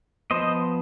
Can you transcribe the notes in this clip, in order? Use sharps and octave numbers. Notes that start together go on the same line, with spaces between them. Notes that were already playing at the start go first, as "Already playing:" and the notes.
F3 B3 C5 D#5